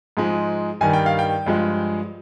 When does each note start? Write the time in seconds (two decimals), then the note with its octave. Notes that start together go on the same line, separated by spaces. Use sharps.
0.17 G#2 F3 G#3
0.81 G2 D#3 G3 G#5
0.93 G5
1.06 F5
1.19 G5
1.46 G2 F3 G#3